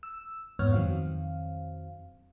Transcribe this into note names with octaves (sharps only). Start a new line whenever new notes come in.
E6
F2 G#2 B3 C#5 F6
F2 D#3 F#3 C4 F5